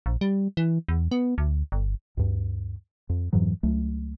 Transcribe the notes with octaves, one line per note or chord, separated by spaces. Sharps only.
A#1
G3
E3
E2
B3
D2
G1
D2 G2
F2
F2 G#2 E3 F#3
C#2 F#3 A3